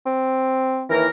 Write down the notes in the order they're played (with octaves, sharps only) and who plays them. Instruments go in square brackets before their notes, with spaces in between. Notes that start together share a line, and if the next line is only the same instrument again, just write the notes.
[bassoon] C4
[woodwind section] D#2 E3 A#4